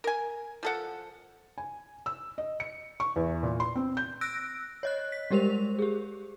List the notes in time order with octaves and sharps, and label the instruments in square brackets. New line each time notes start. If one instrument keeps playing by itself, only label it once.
[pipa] A#4 G#5
F3 A4 F#5
[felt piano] G#5
E6
D#5
C#7
C#6
E2
A#2
C6
C4
G6
[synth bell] E6 F#6 A#6 D7
C#5 D#5 F#6
B6
G3 G#3 G4 A#4 C5 F7
G4 G#4